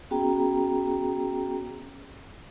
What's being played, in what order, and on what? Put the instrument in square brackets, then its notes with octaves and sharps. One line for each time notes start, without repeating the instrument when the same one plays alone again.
[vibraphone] B3 C#4 F#4 G#4 G5 A#5